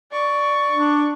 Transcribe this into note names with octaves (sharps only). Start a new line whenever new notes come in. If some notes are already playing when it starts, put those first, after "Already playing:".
D5 C#6
D4